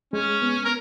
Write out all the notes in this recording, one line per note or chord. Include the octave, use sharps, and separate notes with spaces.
G#3 C#4
B3
A#4